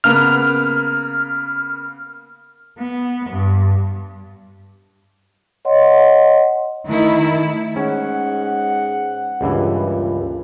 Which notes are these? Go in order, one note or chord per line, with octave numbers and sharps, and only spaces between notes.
C#3 A#3 B3 F6
B3
G2
C#5 D#5 F#5 C6
D#3 A3 E4
G#2 C#4 F#5
C#2 G2 A#2 E3